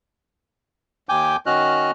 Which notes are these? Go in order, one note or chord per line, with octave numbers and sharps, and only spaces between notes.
D#2 G5 G#5 D6 G6
D#3 C#4 F#4 D#5 F6 F#6